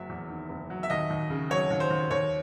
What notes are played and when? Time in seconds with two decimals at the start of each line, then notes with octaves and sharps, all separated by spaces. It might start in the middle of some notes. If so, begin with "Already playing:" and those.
Already playing: F#1 F#3 E5
0.09 E2
0.29 D#3
0.49 F#1
0.70 F#3
0.83 E5
0.90 D#2 D#5
1.10 D#2
1.30 C#3
1.50 F#3 C#5
1.70 D#2
1.80 C5
1.90 D#2
2.11 D#2 C#5